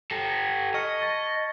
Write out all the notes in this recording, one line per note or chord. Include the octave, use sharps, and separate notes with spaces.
G4 A4 A5 A#6
G#6 B6
D#5 C#6 F6 C#7
A5 C#6 A6